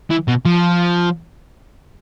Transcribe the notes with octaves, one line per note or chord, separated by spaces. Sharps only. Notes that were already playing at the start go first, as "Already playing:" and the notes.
E3
B2
F3